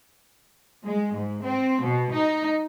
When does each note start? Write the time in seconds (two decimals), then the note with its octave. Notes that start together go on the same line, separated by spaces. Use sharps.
0.83 G#3
1.13 G#2
1.44 C4
1.81 B2
2.12 D#4